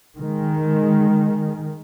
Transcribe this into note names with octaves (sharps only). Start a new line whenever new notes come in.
D#3 G#3